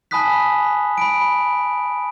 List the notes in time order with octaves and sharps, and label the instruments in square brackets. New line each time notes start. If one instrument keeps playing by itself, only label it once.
[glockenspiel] G#5 A5 B5 D#6 F#6 B6
B5 D7